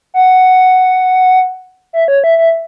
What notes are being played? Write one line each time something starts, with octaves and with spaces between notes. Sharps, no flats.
F#5
E5
C#5
E5
E5